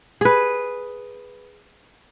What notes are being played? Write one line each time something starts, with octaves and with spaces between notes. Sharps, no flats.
G#4 B4